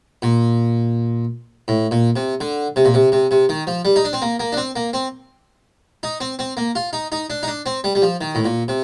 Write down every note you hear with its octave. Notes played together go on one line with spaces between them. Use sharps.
A#2
A2
A#2
C3
D3
C3
A#2
C3
C3
C3
D#3
F3
G3
D#4
D4
C4
A#3
A#3
D4
C4
A#3
C4
D#4
C4
C4
A#3
F4
D#4
D#4
D4
D#4
D4
C4
G3
G3
F3
D#3
A2
A#2
C3